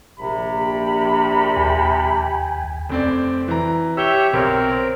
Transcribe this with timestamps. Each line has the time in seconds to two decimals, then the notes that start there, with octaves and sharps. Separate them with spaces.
0.19 A#1 C3 B5
1.57 D#2 G5 G#5
2.89 F1 C4 D5
3.48 E3 A#5
3.97 G4 C#5 E5 E6 G7
4.33 B1 C4 A#4